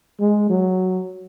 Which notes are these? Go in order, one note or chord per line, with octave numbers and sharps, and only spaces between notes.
G#3
F#3